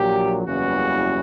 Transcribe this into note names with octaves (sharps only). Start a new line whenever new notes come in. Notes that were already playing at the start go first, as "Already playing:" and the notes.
Already playing: A#1 A#2 F#3 G4
F#1 E2 C#3 E3 G3 F#4